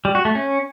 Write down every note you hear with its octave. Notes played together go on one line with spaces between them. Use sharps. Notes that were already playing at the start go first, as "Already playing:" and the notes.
G3
F#4
A3
C#4